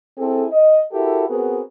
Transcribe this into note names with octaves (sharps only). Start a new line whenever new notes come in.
C4 E4 G#4 A4
D#5
E4 F#4 G4 A4 A#4
B3 C4 F#4 G#4 A#4